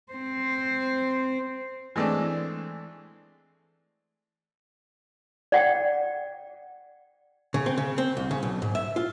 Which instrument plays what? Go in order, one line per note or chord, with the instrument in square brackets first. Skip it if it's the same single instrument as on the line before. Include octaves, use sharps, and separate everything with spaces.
[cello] C4 C5
[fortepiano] E3 G#3 A3 C4 D4
[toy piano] D5 F#5 G5
[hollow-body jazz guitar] C#3
C4
C#3
C4
C2
C#3
B1
G#2
E5
F4